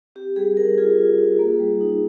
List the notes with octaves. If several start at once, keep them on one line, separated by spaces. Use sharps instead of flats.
C4 G4
G3 G#4
G3 A#4
F4 G#4
F4
F4
A#3
G3
D#4